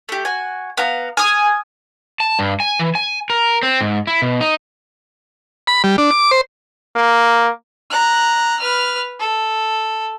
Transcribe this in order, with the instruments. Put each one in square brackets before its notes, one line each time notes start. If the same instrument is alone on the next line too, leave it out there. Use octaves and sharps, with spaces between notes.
[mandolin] A3 G4
F#4 G#5
B3 F5 A#5
[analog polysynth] G#5 [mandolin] D#6 F6
[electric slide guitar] A5
G2
G#5
E3
G#5
A#4
C4
G#2
E4
B2
D#4
[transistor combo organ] B5
G3
D4
D6
C5
[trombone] A#3
[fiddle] A#5 F#6
B4 F6
A4